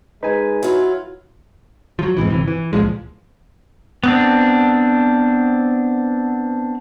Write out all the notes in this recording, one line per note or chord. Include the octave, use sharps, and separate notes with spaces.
G#3 D#4 B4 G#5
F#3 E4 F4
F3 F#3
F2 G#2 C3 E3
G1 C3 E3
E3
C#2 A#2 F3 G#3
B3 C4 D4